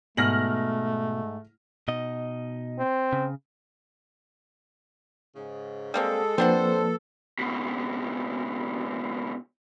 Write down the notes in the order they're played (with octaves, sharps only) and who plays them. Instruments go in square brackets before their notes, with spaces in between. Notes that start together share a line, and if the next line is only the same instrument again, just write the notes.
[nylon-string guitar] G#2 [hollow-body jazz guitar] B2 [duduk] A3 [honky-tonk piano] F6 A#6 F#7
[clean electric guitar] B2 D#4 D#5
[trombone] C4
[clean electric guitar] C#3
[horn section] G#2 C#3
[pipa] G3 A#3 C4 [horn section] G#3 [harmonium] A4
[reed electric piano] F3 A#3 B4 [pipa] C4 D4 F#5 [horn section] C5
[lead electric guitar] C#2 B2